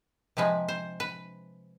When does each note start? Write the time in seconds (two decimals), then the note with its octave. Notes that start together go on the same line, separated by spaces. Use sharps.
0.37 C3 F3 G#3 B4
0.68 C5
1.00 B4